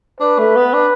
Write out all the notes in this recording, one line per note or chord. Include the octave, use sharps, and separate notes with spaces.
D4 B4
A3
B3
D4